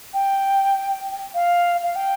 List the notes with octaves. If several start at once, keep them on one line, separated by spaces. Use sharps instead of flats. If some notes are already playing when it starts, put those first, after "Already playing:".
G5
F5
F5
G5